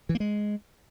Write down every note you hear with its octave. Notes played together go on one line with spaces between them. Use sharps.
E3
A#3
G#3